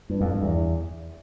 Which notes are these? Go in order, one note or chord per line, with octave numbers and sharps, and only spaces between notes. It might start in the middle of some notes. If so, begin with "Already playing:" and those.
G2
F2
G2
E2